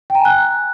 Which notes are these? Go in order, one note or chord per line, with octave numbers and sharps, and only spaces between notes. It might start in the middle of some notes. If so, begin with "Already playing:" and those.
G5
A#5
G#5
F#6